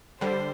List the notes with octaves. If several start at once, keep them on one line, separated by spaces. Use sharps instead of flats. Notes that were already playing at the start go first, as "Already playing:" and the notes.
D3 G3 C5